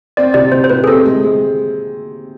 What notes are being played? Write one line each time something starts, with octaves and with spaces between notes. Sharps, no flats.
C4 D5
C3 D5
C3 C5
C5
C3 B4
G#4
C4 A4
G#3
G#3